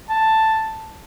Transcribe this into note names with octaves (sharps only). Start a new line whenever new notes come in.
A5